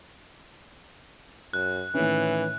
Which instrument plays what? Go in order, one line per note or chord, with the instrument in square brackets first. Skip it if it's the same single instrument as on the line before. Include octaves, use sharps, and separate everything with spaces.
[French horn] F#2 [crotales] F#6
[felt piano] A2 D#3 C#4 [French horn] E3